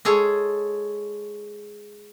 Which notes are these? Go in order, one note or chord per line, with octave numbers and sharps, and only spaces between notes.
G#3 G#4 A4 C#5